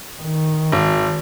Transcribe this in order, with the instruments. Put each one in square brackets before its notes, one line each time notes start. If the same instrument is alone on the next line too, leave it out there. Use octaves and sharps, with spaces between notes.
[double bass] D#3
[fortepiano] G#1